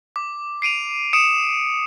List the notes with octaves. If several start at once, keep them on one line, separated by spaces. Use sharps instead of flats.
D6
C7 D7 D#7 F7
D#6 C#7 D7 E7